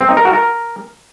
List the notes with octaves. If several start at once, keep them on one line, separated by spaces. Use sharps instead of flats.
C4
D#4
A#4
F#4
A#4